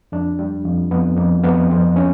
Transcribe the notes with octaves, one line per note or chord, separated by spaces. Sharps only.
F2 D4
G3
F2
F2 B3
F2 A#3
F2 B3
F2 C4
C#4